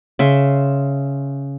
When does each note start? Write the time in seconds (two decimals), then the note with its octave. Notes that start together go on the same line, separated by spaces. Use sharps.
0.19 C#3 E5 C6